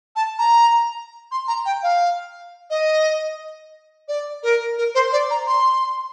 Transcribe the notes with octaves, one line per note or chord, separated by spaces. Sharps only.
A5
A#5
C6
A#5
G5
F5
D#5
D5
A#4
A#4
C5
D5
A#5
C6